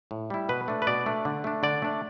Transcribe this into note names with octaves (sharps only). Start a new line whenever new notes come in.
A2
G3 E4
B2 B4
A3 D4
B4
B2 D5
A3 D4
D3
A3 D4
D3 D5
A3 D4